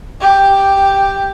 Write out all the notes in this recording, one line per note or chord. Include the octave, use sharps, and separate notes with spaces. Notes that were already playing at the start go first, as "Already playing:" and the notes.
G4